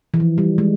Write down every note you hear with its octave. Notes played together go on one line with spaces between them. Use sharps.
E3
F3
G3
G#3